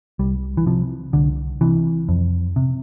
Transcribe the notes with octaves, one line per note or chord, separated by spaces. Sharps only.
C2 G3
E3
C3 F3
C2 D3
C3 E3
F2
C3